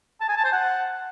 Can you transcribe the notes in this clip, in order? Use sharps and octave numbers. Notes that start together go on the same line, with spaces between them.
A5
G#5
A5
C5
F#5